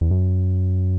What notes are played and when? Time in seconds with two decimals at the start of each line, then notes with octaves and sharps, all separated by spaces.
0.01 E2
0.11 F#2